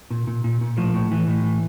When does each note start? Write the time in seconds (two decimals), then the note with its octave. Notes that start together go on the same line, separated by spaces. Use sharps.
0.10 A#2
0.27 A#2
0.44 A#2
0.61 A#2
0.77 A2 F3
0.94 A2
1.11 E3
1.28 A2
1.44 E3